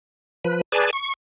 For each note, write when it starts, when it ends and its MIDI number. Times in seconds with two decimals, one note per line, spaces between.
0.45 0.61 53
0.45 0.61 71
0.72 0.91 68
0.72 0.91 71
0.72 0.91 74
0.72 0.91 80
0.72 0.91 81
0.93 1.13 85